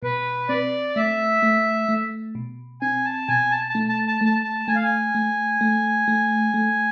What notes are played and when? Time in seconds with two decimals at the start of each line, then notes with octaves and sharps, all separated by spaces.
0.03 B2 B4
0.49 C4 D5
0.96 A3 E5
1.42 A3
1.89 A3
2.35 B2
2.81 C4 G#5
3.05 A5
3.28 B2 G#5
3.51 A5
3.69 A5
3.75 A3
3.89 A5
4.08 A5
4.21 A3 A5
4.44 A5
4.68 A3 G#5
4.75 F5
4.84 G#5
5.15 A3
5.61 A3
6.08 A3
6.54 A3